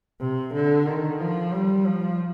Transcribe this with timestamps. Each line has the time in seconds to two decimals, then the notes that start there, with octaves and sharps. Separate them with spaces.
0.21 C3
0.54 D3
0.87 D#3
1.20 F3
1.54 G3
1.87 F3